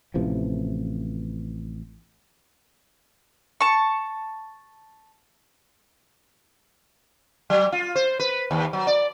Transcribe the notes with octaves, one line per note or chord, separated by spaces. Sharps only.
A1 C3 E3 F3
A5 C#6
F#3
F4
C5
B4
D#2
F#3
D5